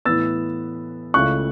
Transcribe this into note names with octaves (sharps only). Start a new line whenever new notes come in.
A2 E3 B3 E6 A6
C#2 C#3 A3 E4 C#6 F#6